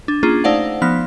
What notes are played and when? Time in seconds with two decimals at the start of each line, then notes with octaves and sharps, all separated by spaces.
0.08 D4
0.23 A#3 C#4 D4 F4 G#4
0.44 A3 D#4 C5 D5 F5 F#5
0.82 F3 B3 D#4 F6 B6